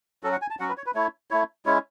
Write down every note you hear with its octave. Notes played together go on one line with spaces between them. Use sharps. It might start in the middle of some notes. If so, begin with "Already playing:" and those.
F#3 C#4 F#4 A4
F#5
G#5
A5
F#3 C#4 F#4 F#5
B4
C#5
B4
A3 E4 C#5
A3 E4 C#5
G#3 C#4 E4 C#5